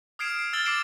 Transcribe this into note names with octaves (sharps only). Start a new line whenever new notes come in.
D#6 F6 G#6 C7 D7 E7
C7
E6 F6 G#6 A6 F#7 G7
D6 E6 A6 C7 D7 E7